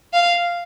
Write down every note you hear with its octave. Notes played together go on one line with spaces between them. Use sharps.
F5